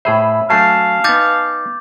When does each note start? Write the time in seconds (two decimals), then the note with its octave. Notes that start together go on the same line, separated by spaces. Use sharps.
0.05 A2 G#4 C5 E5 B5 E6
0.50 F#3 A3 D4 F5 G#5 A5 C7
1.04 B3 D#4 D6 G6 A6